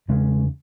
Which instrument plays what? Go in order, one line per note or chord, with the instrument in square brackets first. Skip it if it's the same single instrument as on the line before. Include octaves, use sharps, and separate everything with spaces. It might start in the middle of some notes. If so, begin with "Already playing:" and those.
[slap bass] E2 C#3 G#3